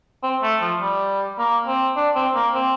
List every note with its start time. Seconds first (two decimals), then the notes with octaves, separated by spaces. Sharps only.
0.23 C4
0.43 A3
0.62 F3
0.81 G3
1.39 A#3
1.67 C4
1.96 D4
2.15 C4
2.35 A#3
2.54 C4